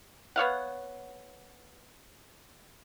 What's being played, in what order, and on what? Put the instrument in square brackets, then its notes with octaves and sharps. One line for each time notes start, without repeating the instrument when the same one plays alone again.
[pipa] B3 C#5 F5 F#5